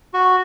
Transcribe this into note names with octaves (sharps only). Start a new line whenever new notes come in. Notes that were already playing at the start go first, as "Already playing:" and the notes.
F#4